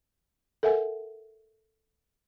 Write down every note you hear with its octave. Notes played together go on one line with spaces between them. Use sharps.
A4 A#4 E5 F#5 G#5